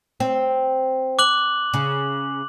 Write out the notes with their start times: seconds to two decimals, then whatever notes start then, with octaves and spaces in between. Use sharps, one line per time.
0.20 C4
1.19 D6 F#6 F#7
1.74 C#3